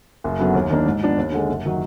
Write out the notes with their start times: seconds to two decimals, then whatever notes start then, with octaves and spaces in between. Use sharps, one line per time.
0.24 F#1
0.39 F#2 D3 F#3 B3
0.55 D#2
0.70 D#3 A#3 D4
0.86 G#2
1.02 F3 B3 D4
1.17 D#2
1.32 D3 G#3
1.49 F#1
1.66 D#3 F#3